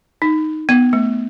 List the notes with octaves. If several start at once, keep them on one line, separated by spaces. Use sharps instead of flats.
D#4
B3
A3